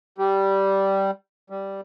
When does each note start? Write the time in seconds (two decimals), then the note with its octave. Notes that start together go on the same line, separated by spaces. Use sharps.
0.18 G3
1.50 G3